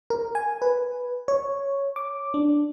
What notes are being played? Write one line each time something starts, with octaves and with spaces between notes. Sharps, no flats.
A#4
G#5
B4
C#5
D6
D4